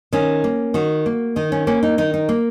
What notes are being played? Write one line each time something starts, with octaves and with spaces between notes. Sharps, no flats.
D#3 C#4
A#3
D#3 F#4
A#3
D#3 D#4
C#4
A#3 C#4
D#4
D#3 D#4
D#4
A#3